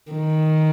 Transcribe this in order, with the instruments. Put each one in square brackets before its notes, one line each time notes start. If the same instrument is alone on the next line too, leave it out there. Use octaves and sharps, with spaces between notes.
[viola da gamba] D#3